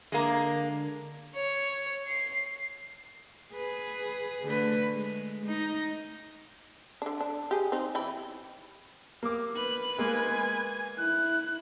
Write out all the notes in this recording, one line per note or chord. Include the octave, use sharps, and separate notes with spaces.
D3 G#3 A#3
C#5
C7
G#4 B4
D3 A3 B4
G#3
D#4
D3 D4
D4
G4 G#4
C4 D#4
E3 G5 B5
A#3 D6
B4 F#7
G#3 A#3 G#5
E4 F#6